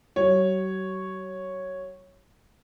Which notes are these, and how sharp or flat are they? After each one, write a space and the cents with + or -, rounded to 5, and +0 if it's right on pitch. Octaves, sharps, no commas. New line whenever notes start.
F#3 +45 C#5 -5